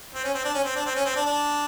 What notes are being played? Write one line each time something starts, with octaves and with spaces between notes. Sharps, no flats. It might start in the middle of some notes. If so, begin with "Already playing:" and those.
C4
C#4
C4
D4
C#4
C4
D4
C4
C#4
C4
D4
D4